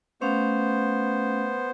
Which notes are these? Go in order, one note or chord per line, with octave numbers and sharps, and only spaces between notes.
A3 B3 C#4 C5 F5